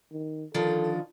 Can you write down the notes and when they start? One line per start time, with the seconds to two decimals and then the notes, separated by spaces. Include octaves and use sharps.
0.12 D#3
0.54 D3 D#3 F3 A4